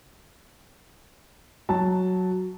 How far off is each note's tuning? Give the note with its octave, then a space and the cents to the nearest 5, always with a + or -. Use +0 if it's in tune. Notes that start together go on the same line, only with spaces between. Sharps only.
F#3 +0 A5 +0